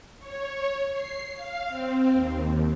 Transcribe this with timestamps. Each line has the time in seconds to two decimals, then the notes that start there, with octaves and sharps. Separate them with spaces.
0.19 C#5
0.92 C7
1.35 F5
1.67 C4
2.12 D#2